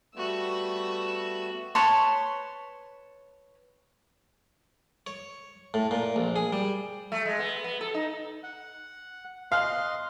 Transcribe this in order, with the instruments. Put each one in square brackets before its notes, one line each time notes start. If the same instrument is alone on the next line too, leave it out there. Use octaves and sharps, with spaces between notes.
[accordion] G3 A3 B3 [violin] F#4 E6
[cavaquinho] B4 C#5 A5 C6
[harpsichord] C#5
A2
A#2
A#1
G#4
G3
[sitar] A3
G#3
B3
B3
A4
D#4
[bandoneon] F#5
[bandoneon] D#5 C6 [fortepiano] F5 F6 F#6